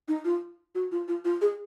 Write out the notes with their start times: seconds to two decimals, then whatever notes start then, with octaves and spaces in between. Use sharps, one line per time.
0.08 D#4
0.25 F4
0.75 F#4
0.92 F4
1.08 F4
1.25 F4
1.41 G#4